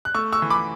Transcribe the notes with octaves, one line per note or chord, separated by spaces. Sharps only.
F#6
A3 C#6 E6
C#6 E6
E3
B5 D6